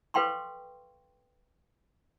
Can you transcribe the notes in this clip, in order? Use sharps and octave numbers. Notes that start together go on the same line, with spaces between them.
A4 B4 F5 G5 C6 C#6